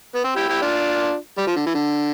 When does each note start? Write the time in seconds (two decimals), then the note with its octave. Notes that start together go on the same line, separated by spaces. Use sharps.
0.15 B3
0.24 C4
0.36 E4 G4
0.49 E4 G4
0.62 D4 F4
1.38 G3
1.47 F3
1.56 D3
1.66 E3
1.75 D3